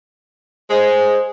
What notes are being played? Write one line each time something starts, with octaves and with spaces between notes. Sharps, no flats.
G#3 C5